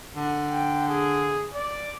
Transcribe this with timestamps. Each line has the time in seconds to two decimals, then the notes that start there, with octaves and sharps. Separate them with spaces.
0.16 D3
0.50 G5
0.88 G#4
1.54 D5